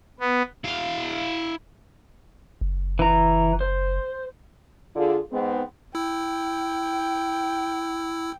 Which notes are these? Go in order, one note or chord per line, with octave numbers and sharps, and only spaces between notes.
B3
E4 F5
F#1
E3 A#5
C5
D3 F4 G#4
G#2 B3 C4
E4 G5 E6